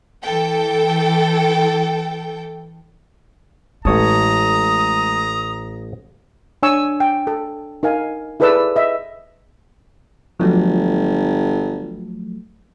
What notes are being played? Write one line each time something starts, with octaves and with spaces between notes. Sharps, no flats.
E3 A4 G5
A1 G#3 C#5 A5 A#5 D#6
D4 C#5 G#5 C#6 E6
G5
A4
D#4 A#4 F5 G#5
E4 G#4 A4 B4 D5 E6
D#5 E5
G1 F3 F#3 A3